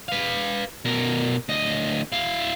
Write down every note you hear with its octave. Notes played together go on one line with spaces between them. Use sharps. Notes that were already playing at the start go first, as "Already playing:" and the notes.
B4 F5
B2 A#4
D2 D#5
E4 F5